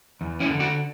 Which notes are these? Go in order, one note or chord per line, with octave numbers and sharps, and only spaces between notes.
E2
C#4 E4
D3
D4 F#4